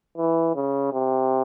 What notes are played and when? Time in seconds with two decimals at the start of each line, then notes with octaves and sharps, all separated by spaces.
0.18 E3
0.55 C#3
0.93 C3